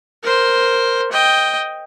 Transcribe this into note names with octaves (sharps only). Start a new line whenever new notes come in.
A#4 C5
D#5 G5